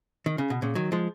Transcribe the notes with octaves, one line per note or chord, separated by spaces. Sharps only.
D#3
C#3
B2
A#2 C#3
D#3 F#3
F3 G#3